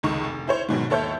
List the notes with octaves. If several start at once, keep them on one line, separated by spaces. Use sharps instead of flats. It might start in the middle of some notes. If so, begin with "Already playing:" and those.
F1 C#2 D#3 C#6
F1
E4 C5 C#5
G#2 B2 D#3 F#3
D#2 A4 C#5 E5 G6